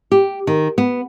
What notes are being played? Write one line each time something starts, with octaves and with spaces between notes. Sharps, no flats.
G4
D#3
B3